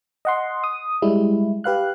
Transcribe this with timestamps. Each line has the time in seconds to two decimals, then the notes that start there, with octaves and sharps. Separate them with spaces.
0.25 D#5 F#5 C6
0.64 D#6
1.02 G3 G#3 E4
1.64 G4 B4 F5 F#6